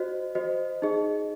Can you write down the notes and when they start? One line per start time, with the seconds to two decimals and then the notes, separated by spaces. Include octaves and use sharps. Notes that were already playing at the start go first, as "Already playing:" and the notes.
Already playing: F#4 C5 D#5
0.35 F#4 C5 D#5
0.82 D#4 G#4 D#5